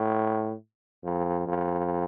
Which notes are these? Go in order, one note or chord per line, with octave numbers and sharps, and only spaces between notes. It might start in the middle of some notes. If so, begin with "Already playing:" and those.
Already playing: A2
F2
F2